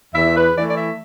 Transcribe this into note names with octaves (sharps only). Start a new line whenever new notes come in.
E2 E5
B4
E3 A3 E4 D5
D5
E5